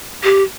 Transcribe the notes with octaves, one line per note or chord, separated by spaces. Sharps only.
G4